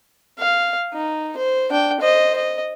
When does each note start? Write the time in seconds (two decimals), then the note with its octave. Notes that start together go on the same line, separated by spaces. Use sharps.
0.39 F5
0.93 D#4
1.37 C5
1.70 D4 G5
2.00 C5 D#5
2.36 D#5